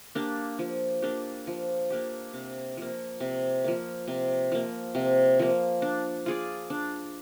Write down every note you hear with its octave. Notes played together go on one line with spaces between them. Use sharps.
A#3 D4 G4
F3
A#3 D4 G4
F3
A#3 D4 G4
C3
F3 A#3
C3
F3 A#3
C3
F3 A#3
C3
F3 A#3
D4
F4 G#4 D5
D4